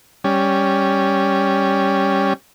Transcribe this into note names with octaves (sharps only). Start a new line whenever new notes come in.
G3 C#4